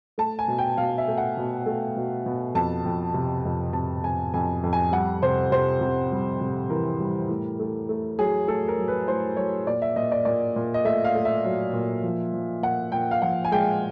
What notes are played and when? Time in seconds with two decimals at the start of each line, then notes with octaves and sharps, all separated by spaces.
0.18 A3 A5
0.39 G#5
0.48 B2
0.58 G5
0.77 B2 F5
0.98 E5
1.08 A3
1.18 F#5
1.37 B2
1.66 A3
1.96 B2
2.26 B2
2.55 F2 A5
2.85 F2
3.14 C3
3.45 F2
3.73 C3 A5
4.03 F2 G#5
4.34 F2 G#5
4.63 F2
4.73 G#5
4.92 G3 F#5
5.22 C3 C5
5.51 C3 C5
5.81 C3
6.12 G3
6.41 C3
6.70 E3 A#4
7.00 G3
7.29 A2
7.59 A3
7.89 A3
8.19 F#3 G#4
8.48 A3 A4
8.68 A#4
8.78 F#3
8.88 B4
9.08 A2 C5
9.37 F#3 C#5
9.67 A#2 D5
9.82 E5
9.96 A#2 D#5
10.12 D5
10.25 A#2 D5
10.56 A#2
10.74 D#5
10.85 A3 E5
11.04 F5
11.14 A3
11.25 E5
11.45 F#3
11.73 A#2
12.03 F3
12.33 F3
12.63 A#2 F#5
12.92 A#2 G5
13.11 F5
13.22 F3 F#5
13.45 G#5
13.52 G#3 G5